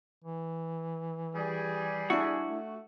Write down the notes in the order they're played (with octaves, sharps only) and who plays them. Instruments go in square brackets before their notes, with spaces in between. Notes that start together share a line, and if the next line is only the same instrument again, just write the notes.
[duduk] E3
[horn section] G3 G#4
[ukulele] D4 E4 [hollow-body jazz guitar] F#4
[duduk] A3